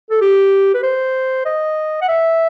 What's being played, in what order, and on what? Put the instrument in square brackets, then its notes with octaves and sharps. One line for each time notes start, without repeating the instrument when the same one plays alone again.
[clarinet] A4
G4
B4
C5
D#5
F#5
E5